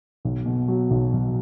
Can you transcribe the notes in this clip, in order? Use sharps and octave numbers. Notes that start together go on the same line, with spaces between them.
B1
B2
F#3
B1
B1